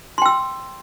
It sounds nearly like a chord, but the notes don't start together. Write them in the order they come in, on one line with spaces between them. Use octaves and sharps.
C6 G5 E6